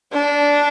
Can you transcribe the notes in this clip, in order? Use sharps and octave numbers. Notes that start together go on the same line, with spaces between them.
D4